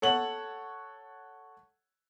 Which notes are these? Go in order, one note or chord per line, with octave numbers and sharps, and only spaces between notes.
A4 C#5 F#5 F#7